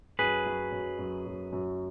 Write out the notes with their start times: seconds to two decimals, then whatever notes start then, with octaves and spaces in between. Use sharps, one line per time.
0.19 F#2 G#4 B4
0.46 F#3
0.72 F#2
0.99 F#2
1.26 F#2
1.53 F#2